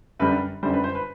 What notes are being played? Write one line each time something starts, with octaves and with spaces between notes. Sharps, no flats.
F#2 D3 G3 B4
F#2 D3 G3 C5
B4
C5
B4